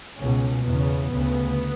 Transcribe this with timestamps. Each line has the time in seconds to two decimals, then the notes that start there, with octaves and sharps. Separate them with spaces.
0.19 C#2 B2 C#4
0.65 E2 C#3 B3
1.10 D2 C#3